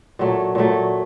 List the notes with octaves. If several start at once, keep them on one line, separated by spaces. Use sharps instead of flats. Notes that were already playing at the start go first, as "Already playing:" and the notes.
A#2 F#3 A3
A#2 F#3 A3